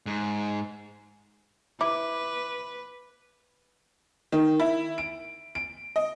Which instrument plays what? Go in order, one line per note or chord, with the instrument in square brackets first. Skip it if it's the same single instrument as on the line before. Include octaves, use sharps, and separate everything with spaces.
[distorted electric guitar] G#2
[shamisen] E4 [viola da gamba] B4 [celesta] D6
[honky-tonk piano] D#3
E4
D7
D7
D#5